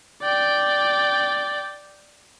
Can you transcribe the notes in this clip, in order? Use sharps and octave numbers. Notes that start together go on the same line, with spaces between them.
D5 G5